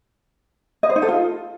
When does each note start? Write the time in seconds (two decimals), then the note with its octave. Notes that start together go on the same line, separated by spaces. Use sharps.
0.83 D#5
0.89 C5
0.96 D#4
1.02 A4
1.09 F4